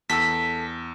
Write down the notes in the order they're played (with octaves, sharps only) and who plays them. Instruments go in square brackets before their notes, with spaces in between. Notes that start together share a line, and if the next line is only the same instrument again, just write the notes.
[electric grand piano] E2 E6 [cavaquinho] A4 [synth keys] B6